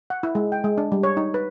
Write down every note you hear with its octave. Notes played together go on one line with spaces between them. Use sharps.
F#5
E4
G#3
G5
G#3
D4
G3
C#5
D#4
B4